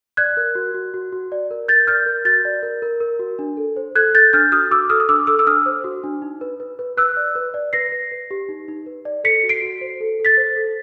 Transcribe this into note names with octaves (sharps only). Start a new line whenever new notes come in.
D5 F#6 G#6
A#4
F#4
F#4
F#4
F#4
D5
A#4
A#4 G6 A6
D5 F6 G6
A#4
F#4 G6 A6
D5
A#4
A#4
A#4
F#4
D4
A4
C5
A4 F#6 G#6
A4 G6 A6
D4 F6 G6
F#4 D#6 F6
F#4 D6 E6
A4 D#6 F6
D#6
D4 D6 E6
A4 D6 E6
E6
D4 D#6 F6
C5
F#4
D4
D#4
B4
B4
B4
B4 E6 F#6
D5
B4
D5
B4 A#6 C7
B4
B4
G4
D#4
D#4
B4
D5
A4 B6 C#7
F#4
C7 D7
F#4
C5
A4
A4
A6 B6
C5
A4